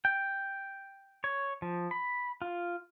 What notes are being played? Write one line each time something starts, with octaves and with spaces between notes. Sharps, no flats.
G5
C#5
F3
B5
F4